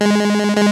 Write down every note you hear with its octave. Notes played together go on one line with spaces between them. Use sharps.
G#3
G#3